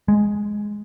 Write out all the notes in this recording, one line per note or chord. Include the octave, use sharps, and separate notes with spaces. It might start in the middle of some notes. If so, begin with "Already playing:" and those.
G#3